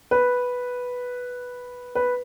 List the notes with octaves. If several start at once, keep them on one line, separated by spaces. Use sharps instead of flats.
B4
B4